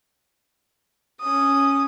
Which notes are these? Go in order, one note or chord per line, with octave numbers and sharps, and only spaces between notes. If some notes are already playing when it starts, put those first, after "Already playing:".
C#4 D#6